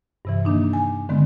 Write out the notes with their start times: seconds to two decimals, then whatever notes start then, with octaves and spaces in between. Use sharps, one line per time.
0.25 G2 C3 E3
0.45 D#3 A#3 D4 D#4
0.73 G#5
1.09 D3 D#3 G#3 B3 C4